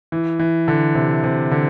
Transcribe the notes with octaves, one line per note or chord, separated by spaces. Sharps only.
E3
E3
D3
C3
C3
D3